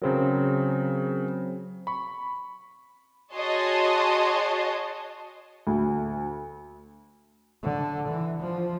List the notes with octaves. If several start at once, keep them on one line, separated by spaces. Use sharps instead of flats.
C#3 F#3 C4 G#4 A#4
B5 C#6
F#4 G#4 C#5 D#5 A5 C6
D2
D3
E3
F3